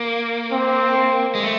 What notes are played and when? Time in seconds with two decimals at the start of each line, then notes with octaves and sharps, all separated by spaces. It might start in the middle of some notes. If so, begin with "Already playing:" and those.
Already playing: A#3
0.52 C4
1.35 G#3
1.44 A3